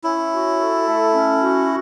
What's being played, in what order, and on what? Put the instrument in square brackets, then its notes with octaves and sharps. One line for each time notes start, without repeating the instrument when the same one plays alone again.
[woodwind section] C#4 [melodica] E4
[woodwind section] F#4
A4
A3
C#4
F#4